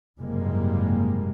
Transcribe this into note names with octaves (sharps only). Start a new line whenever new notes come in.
F#1 G#2 C3 G3 G#3 A#3